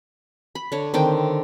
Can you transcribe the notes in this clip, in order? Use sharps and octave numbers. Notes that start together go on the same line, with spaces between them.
B5
D3 C#5
D3 D#3 C4 G5